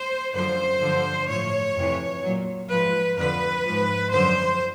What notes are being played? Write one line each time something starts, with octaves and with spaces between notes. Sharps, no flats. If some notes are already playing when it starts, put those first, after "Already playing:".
Already playing: C5
F#2 D3 F3 C5
G2 D3 F3
A2 F3 C#5
F2 C3 E3
A#2 F#3
G#2 F3 B4
F2 D3 F3 B4
G#2 F3
F#2 D3 F3 C5